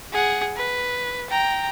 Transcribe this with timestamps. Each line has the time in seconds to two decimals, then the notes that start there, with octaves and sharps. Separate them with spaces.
0.13 G#4 F#5
0.57 B4
1.30 G5 A#5